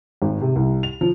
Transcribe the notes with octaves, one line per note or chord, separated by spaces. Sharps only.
G#1
C3
C2
F7
F3